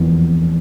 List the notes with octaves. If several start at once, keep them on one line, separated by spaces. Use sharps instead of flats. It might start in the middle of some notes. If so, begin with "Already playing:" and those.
Already playing: F1 E2